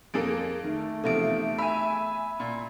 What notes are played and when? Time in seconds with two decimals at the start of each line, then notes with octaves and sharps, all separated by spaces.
0.14 F2 A#3 G#4 A4 D7
0.64 D#3 A3
1.04 E2 C3 F3 A4 E5 D7
1.59 E5 G#5 B5
2.40 A#2